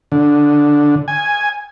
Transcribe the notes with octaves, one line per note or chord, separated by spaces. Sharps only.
D3
G#5